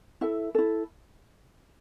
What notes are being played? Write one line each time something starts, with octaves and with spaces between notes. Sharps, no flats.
E4 A4 E5
E4 A4